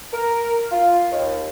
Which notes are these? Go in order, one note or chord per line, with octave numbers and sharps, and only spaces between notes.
A#4
F4
D#2